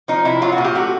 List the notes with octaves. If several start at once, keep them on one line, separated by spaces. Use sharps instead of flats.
F3 D#4
C3 E4
F#3 F4
F#4
A#2
G4
A3 F#4